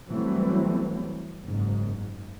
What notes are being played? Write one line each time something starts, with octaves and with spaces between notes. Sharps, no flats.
E3 F#3 G3 A3 C4
F#1 G#2